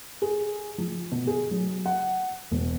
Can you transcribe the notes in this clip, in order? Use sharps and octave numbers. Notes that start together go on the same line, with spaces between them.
G#4
F3
B2
G#4
F#3
F#5
E1